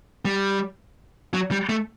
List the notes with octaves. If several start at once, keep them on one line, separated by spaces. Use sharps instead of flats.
G3
F#3
G3
A3